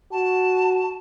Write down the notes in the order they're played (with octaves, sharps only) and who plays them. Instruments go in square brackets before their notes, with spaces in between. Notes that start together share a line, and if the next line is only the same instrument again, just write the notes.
[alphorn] F#4 [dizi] A5